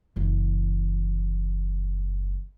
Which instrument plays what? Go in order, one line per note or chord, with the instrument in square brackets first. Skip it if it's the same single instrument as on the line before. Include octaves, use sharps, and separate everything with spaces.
[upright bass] F#1 E3